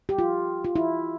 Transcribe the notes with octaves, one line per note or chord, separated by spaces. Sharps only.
G4
F4
F4
E4